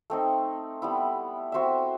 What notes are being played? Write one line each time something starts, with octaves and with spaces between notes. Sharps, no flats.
A3 C4 D#4
G3 B3 E4
C4 F#4 C5 E5